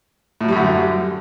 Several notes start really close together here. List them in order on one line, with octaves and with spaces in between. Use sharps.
A2 F#3 G3 F#2 D3